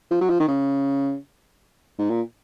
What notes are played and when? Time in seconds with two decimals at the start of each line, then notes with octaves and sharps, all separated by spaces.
0.11 F3
0.21 F#3
0.30 F3
0.40 D#3
0.48 C#3
1.98 G#2
2.10 A#2